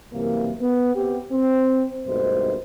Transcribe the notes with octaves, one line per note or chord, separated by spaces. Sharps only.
C2 F#2 C3 E3 A#3
B3
C3 B3 G4
C4
G#1 G2 B2 A3 D#4 C5